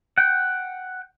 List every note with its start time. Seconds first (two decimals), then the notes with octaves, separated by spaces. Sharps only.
0.18 F#5 G5